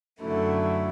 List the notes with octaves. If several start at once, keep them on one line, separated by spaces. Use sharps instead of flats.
F#2 D3 F#3 A3 E4